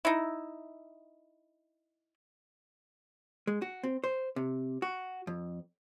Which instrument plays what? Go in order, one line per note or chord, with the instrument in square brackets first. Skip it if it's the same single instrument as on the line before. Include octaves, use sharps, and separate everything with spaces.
[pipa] D#4 E4
[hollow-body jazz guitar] G#3
F#4
C4
C5
C3
F#4
F2